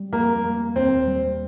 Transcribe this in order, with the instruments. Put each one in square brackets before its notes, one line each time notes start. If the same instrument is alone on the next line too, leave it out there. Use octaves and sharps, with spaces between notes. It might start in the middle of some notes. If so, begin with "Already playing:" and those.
Already playing: [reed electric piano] G3
[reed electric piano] F2 [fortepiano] A#3
[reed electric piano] A#3
[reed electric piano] D#2 [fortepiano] C4
[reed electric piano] G3